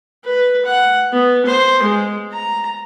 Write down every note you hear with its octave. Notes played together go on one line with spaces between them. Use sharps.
B4
F#5
B3
C5
G#3
A#5